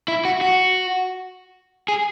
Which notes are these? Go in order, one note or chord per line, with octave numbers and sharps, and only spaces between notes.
E4
F#4
F#4
G#4